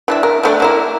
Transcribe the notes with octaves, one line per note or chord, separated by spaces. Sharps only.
E3 D4 E5
A#4
F3 A3 D4
A#3 E4 A#4